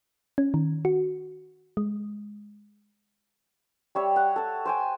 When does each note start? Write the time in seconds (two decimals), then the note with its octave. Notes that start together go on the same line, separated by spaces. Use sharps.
0.38 C#4
0.54 D#3
0.85 F#4
1.77 G#3
3.95 G3 C#5 E5
4.16 F#5
4.36 A4 F#5
4.65 C5 G5 G#5